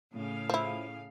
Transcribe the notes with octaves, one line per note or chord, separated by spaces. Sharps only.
A2 C#3 F5
F3 E4